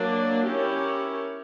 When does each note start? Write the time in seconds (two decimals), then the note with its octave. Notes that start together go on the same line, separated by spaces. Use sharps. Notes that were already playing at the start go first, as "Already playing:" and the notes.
Already playing: F#3 A#3 D4
0.47 C#4 E4 G4 A#4 C#5